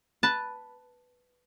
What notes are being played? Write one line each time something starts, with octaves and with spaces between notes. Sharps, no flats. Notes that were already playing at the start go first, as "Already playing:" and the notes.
B4 A5